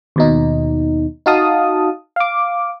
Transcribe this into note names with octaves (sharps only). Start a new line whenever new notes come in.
D#2 B2 D#4
D#4 F#4 F5 A5 D#6
F5 D6